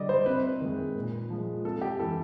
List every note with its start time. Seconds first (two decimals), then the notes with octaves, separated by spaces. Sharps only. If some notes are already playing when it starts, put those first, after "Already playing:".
Already playing: D3 G3 D5 D#5
0.09 C5
0.26 C3 B4
0.60 D#3 G#3
0.96 A#2
1.30 F3 G#3
1.65 C3 A4
1.82 G4
2.00 E3 G#3 A4